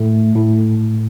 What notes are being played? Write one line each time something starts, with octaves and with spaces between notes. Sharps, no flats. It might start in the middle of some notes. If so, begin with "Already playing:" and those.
Already playing: A2 A3
A2